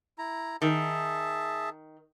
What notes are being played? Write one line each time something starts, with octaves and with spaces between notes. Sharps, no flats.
E4 A#5
D#3 G#4 E5 A5